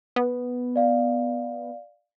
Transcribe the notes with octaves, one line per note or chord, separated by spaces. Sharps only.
B3
D5 F5